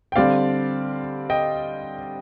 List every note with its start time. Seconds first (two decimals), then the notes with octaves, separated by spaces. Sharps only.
0.12 G5
0.16 D3 G3 C4 D5 F5
1.30 D#5 G5